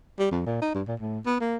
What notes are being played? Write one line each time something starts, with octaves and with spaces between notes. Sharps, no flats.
G3
F2
A#2
D#4
G2
A#2
A2
B3
A#3